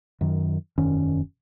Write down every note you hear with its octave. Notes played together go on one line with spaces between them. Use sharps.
F#2 D#3
E1 F#2 D#3 C#4